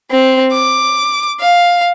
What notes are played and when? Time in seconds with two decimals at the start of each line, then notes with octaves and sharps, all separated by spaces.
0.10 C4
0.53 D6
1.41 F5